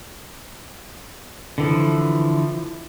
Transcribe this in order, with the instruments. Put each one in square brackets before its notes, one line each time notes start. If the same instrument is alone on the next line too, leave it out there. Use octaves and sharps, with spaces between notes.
[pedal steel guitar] D3 E3 F3